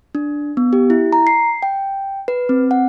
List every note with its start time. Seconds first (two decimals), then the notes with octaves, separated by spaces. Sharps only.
0.15 D4
0.57 B3
0.73 G4
0.90 E4
1.13 A#5
1.27 C7
1.63 G5
2.28 B4
2.49 C4
2.71 F#5